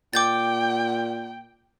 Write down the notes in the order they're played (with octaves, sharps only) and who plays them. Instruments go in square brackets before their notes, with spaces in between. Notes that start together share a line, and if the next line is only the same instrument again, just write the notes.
[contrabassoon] A#2 [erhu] G5 [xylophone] D6 G6 A6